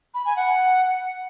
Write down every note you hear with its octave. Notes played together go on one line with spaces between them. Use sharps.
B5
G#5
F#5